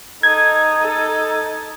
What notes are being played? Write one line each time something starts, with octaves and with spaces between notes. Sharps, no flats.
D#4 A4 G#6
A4